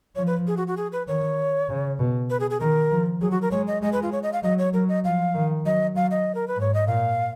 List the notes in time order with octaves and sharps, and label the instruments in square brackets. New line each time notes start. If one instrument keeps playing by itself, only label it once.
[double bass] F3 [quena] C#5
[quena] B4
G#4
F#4
F#4
G#4
B4
[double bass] D#3 [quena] C#5
[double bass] C#3
B2
[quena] B4
G#4
G#4
[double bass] D#3 [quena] A#4
[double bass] F3
[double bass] F#3 [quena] G#4
[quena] F#4
A#4
[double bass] G#3 [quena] C#5
[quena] D#5
[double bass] G#3 [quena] D#5
[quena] B4
F4
C#5
D#5
F5
[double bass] F#3 [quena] D#5
[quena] C#5
[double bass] F#3 [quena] A#4
[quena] D#5
[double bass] F3 [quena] F5
[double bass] D#3
[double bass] F#3 [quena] D#5
[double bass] F#3 [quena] F5
[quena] D#5
A#4
B4
[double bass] G#2
[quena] C#5
D#5
[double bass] A#2 [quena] F5